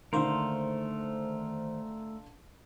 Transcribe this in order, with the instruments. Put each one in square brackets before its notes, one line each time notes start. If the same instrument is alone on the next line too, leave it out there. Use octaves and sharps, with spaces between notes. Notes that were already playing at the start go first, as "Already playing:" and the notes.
[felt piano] D3 F5 C6 [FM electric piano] D#3 A#3 C5 [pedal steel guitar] A3 A#4